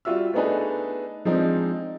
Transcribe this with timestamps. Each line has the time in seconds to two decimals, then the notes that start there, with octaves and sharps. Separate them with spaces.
0.05 G3 F4 F#4 E5 E6
0.34 A3 B3 D4 D#4 G#4 B4
1.25 F3 G#3 C4 D4 D#4